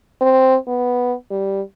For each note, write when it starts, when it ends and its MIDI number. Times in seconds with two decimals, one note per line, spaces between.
0.21 0.56 60
0.67 1.13 59
1.31 1.62 55